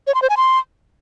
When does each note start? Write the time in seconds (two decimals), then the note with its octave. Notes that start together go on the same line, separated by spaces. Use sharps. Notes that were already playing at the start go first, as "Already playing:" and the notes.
0.07 C#5
0.15 C6
0.22 C5
0.30 G#5
0.37 C6